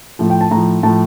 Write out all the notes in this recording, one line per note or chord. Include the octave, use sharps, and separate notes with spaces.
A2 F3
G5
A5
A2 F3 A#5
A2 F3 A5